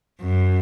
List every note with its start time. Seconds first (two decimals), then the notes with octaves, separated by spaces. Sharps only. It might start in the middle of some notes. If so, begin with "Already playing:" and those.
0.21 F#2